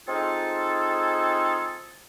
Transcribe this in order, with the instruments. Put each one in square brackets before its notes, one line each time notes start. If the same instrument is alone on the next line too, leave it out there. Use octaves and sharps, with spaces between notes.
[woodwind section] G#3 C4 D#4 F4 G#4 A4